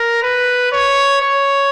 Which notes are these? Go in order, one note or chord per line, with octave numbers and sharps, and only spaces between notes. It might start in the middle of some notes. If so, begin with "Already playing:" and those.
Already playing: A#4
B4
C#5
C#5